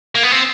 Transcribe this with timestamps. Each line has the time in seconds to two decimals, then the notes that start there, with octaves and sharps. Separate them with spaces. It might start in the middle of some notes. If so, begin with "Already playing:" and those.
0.15 A#3
0.23 B3
0.31 C4